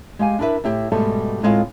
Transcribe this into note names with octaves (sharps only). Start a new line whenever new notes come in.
G#3 G4 F5 G#5
D4 E4 A#4 B4 E5
A2 E4 G4
G#2 B2 G3 A3 A4
A2 G#3 A3 C4 F4 F5